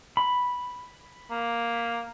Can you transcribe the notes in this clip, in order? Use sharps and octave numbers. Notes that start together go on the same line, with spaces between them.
B5
A#3